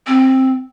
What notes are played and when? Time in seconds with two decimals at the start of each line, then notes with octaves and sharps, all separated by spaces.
0.07 C4